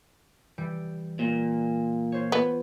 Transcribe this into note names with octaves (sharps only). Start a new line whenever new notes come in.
E3 G3 G5
A#2
F4 C5 C#5
B3